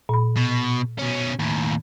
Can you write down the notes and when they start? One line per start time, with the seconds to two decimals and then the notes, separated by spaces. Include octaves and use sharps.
0.09 A#2 B5
0.36 B2
0.99 B2 C#4
1.39 D#2 A2